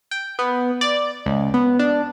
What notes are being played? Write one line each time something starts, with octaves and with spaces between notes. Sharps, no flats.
G5
B3
D5
C#2
B3
D4